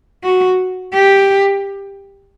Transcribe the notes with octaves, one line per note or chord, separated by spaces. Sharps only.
F#4
G4